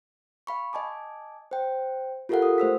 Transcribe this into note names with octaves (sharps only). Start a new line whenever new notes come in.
F5 B5 C#6
D#5 G#5 A5 D6
C5 G5
F4 G4 A4 A#4 F5 F#5
D#6
A3 C5 E6 B6